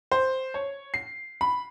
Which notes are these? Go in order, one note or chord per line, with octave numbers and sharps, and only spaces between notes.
C5
C#5
C7
B5